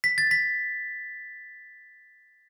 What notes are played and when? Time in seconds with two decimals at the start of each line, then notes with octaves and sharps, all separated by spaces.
0.04 B6
0.18 A6
0.31 B6